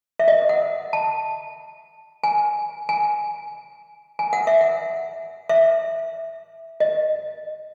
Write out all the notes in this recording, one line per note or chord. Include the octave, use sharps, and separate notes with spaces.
E5
D#5
F#5
A5
G#5
G#5
G#5
F#5
E5
F#5
E5
D#5